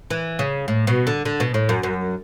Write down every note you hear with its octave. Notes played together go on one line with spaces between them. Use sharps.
E3
C#3
A2
B2
D3
D3
B2
A2
F#2
F#2